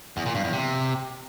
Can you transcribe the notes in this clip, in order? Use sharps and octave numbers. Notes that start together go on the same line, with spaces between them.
E2
A#2
G2
E2
C3